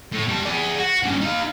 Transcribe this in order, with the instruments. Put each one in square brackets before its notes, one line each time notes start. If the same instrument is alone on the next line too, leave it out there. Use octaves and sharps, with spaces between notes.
[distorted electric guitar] A2
G3 A5
G#4 D5
F#4
G2 C#3
D#4 F5